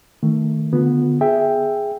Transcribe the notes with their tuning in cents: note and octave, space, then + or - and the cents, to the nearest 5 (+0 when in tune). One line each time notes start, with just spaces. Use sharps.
D#3 +0 A3 +15
D3 +0 B3 +0 F4 +40
G#4 +0 E5 +0 G5 +5